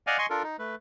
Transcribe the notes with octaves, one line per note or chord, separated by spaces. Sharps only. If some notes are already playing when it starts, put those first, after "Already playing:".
D5 D#5 F5 F#5 G#5
D#5 G#5 C6 C#6
D4 F4 A4 A#4
D#4
A3 B4